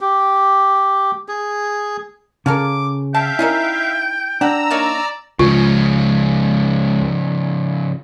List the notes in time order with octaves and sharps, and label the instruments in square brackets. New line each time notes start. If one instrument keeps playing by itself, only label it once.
[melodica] G4
G#4
[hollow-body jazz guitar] C#3 [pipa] F4 A4 A#4 [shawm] D6
[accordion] E5 F5 [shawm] G5 [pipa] A5
[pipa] C#4 D#4 A#4 [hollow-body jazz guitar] E4
[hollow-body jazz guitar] D4 [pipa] G4 F#5 [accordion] A#5 E6
[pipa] A#3 D#4 C#5 [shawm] D5
[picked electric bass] C#2 [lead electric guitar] C#3 F3 [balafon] F4